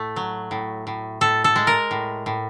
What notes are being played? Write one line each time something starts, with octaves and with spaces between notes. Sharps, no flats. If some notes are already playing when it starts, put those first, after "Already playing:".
Already playing: A2 A3
F#3
A2
A2
A2 A4
A4
G#3
A#4
A2
A2